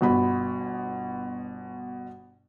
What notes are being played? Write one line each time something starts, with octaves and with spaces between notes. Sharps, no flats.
G1 B2 B5